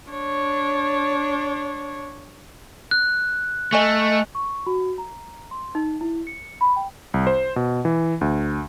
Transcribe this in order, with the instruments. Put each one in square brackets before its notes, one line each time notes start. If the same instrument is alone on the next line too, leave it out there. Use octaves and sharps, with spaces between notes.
[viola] D4 C#5
[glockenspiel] F#6
[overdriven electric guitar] A3 [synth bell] D#5 G#5 C#6
[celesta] C#6
F#4
A#5
C6
D#4
E4
C#7
B5
G5
[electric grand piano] C2
C5
B2
E3
D2